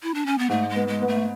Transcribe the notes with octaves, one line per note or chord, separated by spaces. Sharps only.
E4
D4
C#4
B3
G#2 A3
G#3
B3
G#3
B3
A3